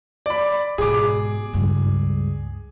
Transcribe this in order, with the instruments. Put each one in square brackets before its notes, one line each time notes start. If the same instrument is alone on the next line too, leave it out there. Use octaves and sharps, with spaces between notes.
[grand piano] D5 B5
[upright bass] G#2 B2 [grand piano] G#4 D6
[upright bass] C#2 G2